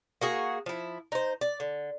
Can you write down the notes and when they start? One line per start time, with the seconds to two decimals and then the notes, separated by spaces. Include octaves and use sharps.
0.21 A#3 F#4 G#4
0.66 F3 E4
1.12 D#4 C5
1.41 D5
1.60 D3